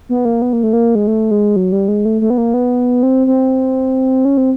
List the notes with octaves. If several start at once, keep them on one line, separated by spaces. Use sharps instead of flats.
B3
A#3
B3
A#3
A3
A#3
G#3
A3
G#3
F#3
G3
G#3
A3
A3
B3
A#3
B3
C4
C4
C#4
C4